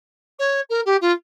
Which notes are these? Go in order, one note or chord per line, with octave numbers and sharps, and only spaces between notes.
C#5
A#4
G4
F4